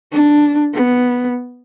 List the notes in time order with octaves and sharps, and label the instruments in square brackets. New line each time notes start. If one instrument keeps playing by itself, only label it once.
[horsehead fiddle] D4
B3